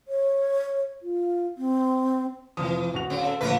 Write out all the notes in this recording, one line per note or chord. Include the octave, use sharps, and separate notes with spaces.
C#5
F4
C4
F1 E3 F3 D#6
D1 F#4 F7
C#3 C4
A4
D2 A#2 F3 A#4 B4